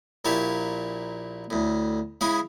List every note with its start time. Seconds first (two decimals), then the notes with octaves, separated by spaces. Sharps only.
0.25 A#1 A#2 E4 G4 C#5 A5
1.50 D2 A2
2.21 C#3 G#3 E4 D#5 B5